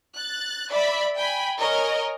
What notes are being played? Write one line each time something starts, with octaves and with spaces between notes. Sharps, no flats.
F#6 A6
D5 E5 B5
G5 G#5 B5
A#4 C#5 D#5 G#5